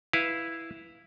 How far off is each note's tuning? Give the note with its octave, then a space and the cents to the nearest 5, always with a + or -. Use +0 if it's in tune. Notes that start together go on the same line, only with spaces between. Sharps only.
E4 +0 B4 +0 F5 -10